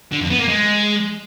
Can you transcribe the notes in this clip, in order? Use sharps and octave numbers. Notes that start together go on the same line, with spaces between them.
D3
F2
B3
A#3
G#3